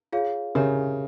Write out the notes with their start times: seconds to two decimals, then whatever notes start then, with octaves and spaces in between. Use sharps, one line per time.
0.12 F4 G#4 C#5 F5
0.55 C#3 G4 A#4 C#5 E5